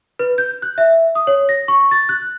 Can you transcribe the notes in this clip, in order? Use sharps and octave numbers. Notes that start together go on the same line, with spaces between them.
B4
G6
F#6
E5
D#6
C#5
A#6
C#6
A6
F#6